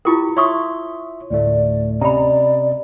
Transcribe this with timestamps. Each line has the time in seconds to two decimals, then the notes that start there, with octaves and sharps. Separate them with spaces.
0.05 E4 F4 G4 A#4 C#6
0.37 C#5 E5 C6 C#6 D#6
1.31 D2 A2 A3 D5
2.01 C3 C#4 D5 D#5 A#5 B5